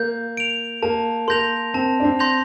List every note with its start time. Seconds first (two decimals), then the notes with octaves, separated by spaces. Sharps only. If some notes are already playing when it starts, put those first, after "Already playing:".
Already playing: A#3 G6
0.37 D7 F7
0.83 A#3 A5
1.28 A#3 C6 G6 A#6 F7
1.74 C4 A5
2.00 D4
2.05 C4
2.19 C6 G6 A#6 F7